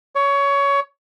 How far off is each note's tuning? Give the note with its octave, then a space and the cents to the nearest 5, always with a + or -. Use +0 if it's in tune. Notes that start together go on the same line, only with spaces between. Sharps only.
C#5 +20